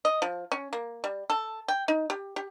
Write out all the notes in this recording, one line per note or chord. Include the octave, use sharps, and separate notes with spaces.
D#5
F3
C#4
A#3
G3
A4
G5
D#4
G4
G4